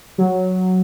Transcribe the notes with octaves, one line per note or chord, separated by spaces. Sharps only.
F#3